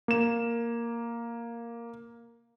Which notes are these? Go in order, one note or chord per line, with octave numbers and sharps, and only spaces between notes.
A#3 E7